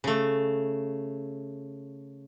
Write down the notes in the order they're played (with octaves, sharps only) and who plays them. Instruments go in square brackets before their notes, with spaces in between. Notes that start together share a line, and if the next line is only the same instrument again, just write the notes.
[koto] C#3 A3